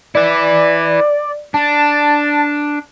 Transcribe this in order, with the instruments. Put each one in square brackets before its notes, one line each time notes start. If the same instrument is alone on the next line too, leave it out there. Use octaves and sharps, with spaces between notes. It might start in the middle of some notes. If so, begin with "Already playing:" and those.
[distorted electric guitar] E4 B4 [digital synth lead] D5
[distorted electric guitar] D4 [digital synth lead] A5